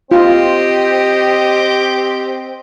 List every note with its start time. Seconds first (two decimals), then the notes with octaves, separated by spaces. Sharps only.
0.11 C4 F4 G4 D#5